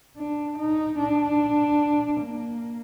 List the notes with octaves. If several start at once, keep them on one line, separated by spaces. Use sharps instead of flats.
D4
D#4
D4
A#3